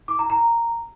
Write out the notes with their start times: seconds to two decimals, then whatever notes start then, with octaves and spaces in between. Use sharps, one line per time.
0.08 D6
0.19 A#5
0.30 A#5